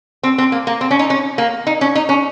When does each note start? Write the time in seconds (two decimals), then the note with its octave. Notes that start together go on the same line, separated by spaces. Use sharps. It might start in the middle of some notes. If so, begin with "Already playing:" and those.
0.23 C4
0.38 C4
0.52 A#3
0.67 A#3
0.81 C4
0.91 C#4
0.99 D#4
1.10 C#4
1.38 A#3
1.67 D#4
1.81 C#4
1.95 D#4
2.09 C#4